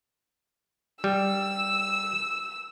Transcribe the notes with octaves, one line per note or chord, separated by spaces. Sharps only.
G3 E6